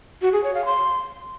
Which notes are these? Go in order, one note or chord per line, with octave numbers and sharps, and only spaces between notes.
F#4
G#4
C#5
F5
C6